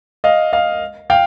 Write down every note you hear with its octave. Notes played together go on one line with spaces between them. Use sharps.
D#5 F5
D#5 F5
F5 G5